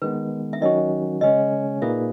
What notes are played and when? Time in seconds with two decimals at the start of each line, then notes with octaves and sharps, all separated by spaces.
0.02 D#3 G#3 B3 B4
0.53 E5
0.61 D#3 F#3 C#4 F#4 D#5
1.21 C#3 G#3 C#4 D#5
1.82 A#2 A#3 D#4 G#4 B4 E5